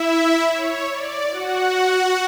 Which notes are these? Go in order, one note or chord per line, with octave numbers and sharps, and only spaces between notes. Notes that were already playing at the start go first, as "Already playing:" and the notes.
Already playing: E4 E5
C#5
D5
F#4 F#5